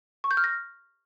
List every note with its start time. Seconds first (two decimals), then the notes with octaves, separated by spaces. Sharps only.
0.24 C#6
0.31 G6
0.37 F6
0.44 A#6